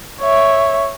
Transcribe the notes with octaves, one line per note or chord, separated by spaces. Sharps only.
C#5 E5